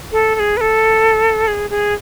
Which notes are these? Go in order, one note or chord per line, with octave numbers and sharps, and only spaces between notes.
A4
A4
G#4
B4
A4
G#4
G#4